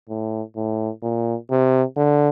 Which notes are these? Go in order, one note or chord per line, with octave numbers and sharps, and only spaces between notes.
A2
A2
A#2
C3
D3